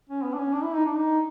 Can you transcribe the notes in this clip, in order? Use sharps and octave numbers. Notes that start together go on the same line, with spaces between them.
C#4
B3
D4
C#4
D4
E4
D#4
D4
D#4